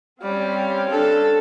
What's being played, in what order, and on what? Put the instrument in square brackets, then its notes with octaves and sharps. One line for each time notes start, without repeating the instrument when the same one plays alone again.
[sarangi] G3 [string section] C4 C#4 [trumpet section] C#5 F5 G5
[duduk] D4 [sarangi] A4